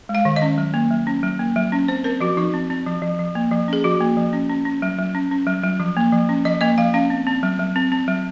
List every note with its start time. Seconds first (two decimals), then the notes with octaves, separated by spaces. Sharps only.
0.09 G#3
0.15 F5
0.25 D#3
0.36 D#5
0.42 C#4
0.58 F#3
0.74 A#3
0.91 F#3
1.07 C#4
1.23 F#3
1.39 A#3
1.56 F#3
1.72 C#4
1.88 C4 C5
2.04 C4 A#4
2.20 F3 F#4
2.37 F3 D#4
2.54 C4
2.70 C4
2.86 F3
3.02 F3
3.19 F3
3.35 A#3
3.51 F3
3.68 C#4 G#4
3.84 F3 F#4
4.00 A#3
4.17 F3
4.33 C#4
4.49 C#4
4.65 C#4
4.82 F#3
4.99 F#3
5.15 C#4
5.31 C#4
5.47 F#3
5.64 F#3
5.80 F3
5.97 A#3
6.13 F3
6.29 C#4
6.45 F3 D#5
6.61 A#3 D#5
6.78 F3 F5
6.94 C#4 F5
7.10 C4
7.27 C4
7.43 F#3
7.59 F#3
7.76 C4
7.92 C4
8.08 F#3